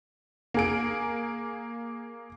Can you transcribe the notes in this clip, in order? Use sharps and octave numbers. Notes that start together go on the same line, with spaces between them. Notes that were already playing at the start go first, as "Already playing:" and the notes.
A#3 G#4 D7